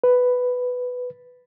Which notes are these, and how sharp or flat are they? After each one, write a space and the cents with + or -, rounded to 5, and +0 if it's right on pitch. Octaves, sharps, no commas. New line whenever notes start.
B4 +5